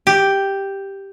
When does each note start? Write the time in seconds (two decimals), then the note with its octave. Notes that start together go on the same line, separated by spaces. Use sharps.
0.07 G4